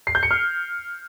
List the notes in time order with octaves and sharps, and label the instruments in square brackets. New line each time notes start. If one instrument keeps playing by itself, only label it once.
[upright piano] C7
G6
C#7
F6